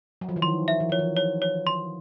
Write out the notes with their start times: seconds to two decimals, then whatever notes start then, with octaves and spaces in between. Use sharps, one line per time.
0.21 F#3
0.29 F3
0.36 E3
0.42 D#3 C6
0.68 E5
0.80 E3
0.89 F3 C#5
0.99 E3
1.17 C#5
1.42 C#5
1.67 C6